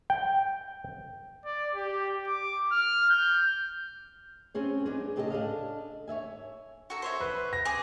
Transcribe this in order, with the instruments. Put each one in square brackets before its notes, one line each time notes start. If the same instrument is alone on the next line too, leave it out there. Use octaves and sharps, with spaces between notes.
[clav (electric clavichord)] G5
[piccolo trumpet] D5
G4
D6
F6
G6
[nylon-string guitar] C4 C#4 G#4 C#5
B3 D4 D#4 G#4
A2 C#3 G4 A4 B4 D#5
D4 A4 D#5 F5
C#5 D5 E5 G#5
[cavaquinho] F#4 A4 A#5
C5 C#5 E5
[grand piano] B4
A#6
[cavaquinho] G#4 G#5 D6